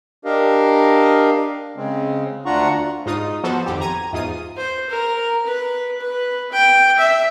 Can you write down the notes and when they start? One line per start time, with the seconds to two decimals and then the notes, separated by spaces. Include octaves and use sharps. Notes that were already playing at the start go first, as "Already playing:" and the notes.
0.25 D4 G4 A#4 D#5 F5
1.76 C#3 G#3 C4
2.46 D2 D4 F4 F#5 A#5 C#6
3.06 G#2 D#4 F4 D#6
3.44 F3 B3 F#4 A4 C5
3.66 G#1 F2 G4
3.81 A#5 G#6 D#7
4.13 E2 G#2 F4 D#6 D#7
4.57 C5
4.89 A#4
5.45 B4
6.00 B4
6.51 G5
6.98 E5